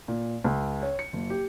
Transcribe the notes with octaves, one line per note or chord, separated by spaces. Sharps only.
A#2
C#2
C#5
C#7
F#1
G4